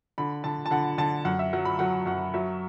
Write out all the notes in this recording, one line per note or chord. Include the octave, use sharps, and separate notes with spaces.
D3 B5
D3 A5
A5
D3 F#5
D3 A5
F#2 F#5
E5
F#3 F#5
B5
F#3 F#5
F#2 F#5
F#3 E5